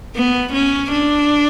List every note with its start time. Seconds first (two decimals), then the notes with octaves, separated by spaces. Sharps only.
0.15 B3
0.53 C#4
0.91 D4